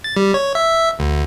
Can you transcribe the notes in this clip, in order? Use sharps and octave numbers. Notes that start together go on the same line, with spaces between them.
A6
G3
C#5
E5
D2